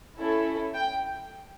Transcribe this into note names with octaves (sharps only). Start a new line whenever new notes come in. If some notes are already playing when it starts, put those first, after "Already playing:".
C#4 E4 A4
G5